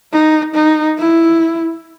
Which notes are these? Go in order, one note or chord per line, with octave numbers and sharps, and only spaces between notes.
D#4
D#4
E4